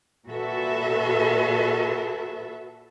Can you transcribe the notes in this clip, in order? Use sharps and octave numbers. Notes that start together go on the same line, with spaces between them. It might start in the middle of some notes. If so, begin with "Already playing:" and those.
A#2 F#4 A4 B4 E5